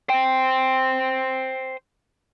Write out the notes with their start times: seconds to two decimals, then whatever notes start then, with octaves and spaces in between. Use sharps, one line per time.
0.09 C5 G5